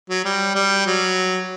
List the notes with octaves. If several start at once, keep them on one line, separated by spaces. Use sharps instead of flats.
F#3
G3
G3
F#3